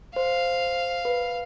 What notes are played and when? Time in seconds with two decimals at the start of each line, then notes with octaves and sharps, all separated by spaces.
0.16 C5 F5
1.05 B4